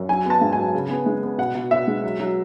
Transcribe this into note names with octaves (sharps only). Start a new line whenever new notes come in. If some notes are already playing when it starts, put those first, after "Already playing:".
Already playing: F#2
F#3 G#5
B3 A5
G#2
G#5
F#3
C#3
B3
G#3
B3
B2 F#5
B2
B2 E5
G#3
F#3
F#3